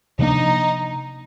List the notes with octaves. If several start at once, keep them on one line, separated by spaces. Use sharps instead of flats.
C3 F3 A#3 D4 D#4